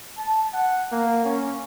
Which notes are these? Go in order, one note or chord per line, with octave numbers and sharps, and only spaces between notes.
A5
F#5
A#3
C#4